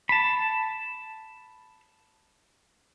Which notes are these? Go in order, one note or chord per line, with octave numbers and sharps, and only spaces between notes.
A5 B5